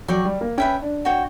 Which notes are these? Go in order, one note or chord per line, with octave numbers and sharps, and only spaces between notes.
F#3 D5 G5 C#6
G3
A#3
C#4 B4 E5 G5
D4
F#4 C#5 G5